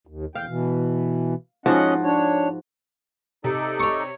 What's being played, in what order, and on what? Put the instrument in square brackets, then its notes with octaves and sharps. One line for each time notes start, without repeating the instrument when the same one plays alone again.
[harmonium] D#2
[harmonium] E2 G5 [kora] F5
[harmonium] B2 E3
[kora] G#2 F3 F#4 [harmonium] C#4 D#5 F#5
[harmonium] D4 C#5
[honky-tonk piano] C3 [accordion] D#4 A4 D5
[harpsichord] C#5 C#6